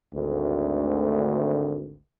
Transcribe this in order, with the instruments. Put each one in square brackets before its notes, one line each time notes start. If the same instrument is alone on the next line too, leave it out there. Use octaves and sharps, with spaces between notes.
[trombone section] G#1 D2